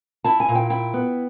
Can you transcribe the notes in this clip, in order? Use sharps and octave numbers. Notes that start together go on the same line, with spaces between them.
E4 A5
G#5
A#2
G5
E4 G5
B3